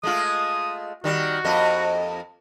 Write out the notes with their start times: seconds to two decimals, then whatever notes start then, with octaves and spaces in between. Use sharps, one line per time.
0.03 G#3 A3 F4 D#6
1.04 D#3 G3 F#4
1.45 F2 A#3 D#5